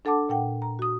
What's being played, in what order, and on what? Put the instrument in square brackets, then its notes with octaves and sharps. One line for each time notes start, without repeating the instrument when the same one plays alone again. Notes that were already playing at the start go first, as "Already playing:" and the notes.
[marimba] D4 A4 F#5 A5 D6
A#2 F#5 G5
A#5
F#4 D#6